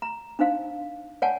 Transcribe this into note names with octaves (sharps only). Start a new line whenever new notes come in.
A#5
D4 D#4 C5 F5
C#5 D5 F#5 G#5 A5